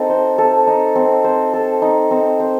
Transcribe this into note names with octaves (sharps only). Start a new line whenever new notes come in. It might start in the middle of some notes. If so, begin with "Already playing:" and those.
Already playing: C4 D#4 A4
C5
A4
D#4
C4
C5
A4
D#4
C4
C5